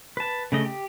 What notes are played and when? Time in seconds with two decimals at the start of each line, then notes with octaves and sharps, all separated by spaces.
0.17 B4 A5
0.52 C#3 A3 D#5
0.65 G4